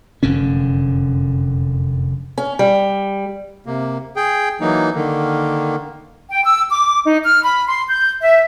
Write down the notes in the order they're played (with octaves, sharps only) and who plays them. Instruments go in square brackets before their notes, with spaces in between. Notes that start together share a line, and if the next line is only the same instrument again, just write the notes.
[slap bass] F1 F#2 D3 C#4
[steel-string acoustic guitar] C#4
G3
[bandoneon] C3 A#3
G#4 G5
E3 F#3 A#3 D#4
D3 D#3 A#3
[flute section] G5
E6
D6
D#4
F6
B5
C6
G6
E5